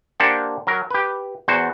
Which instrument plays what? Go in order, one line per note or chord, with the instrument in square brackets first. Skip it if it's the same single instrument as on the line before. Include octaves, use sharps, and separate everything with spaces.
[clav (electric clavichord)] A#3 D4 G4 C5 F#5
F#3 A#4
G4 B4
E2 F#4 C5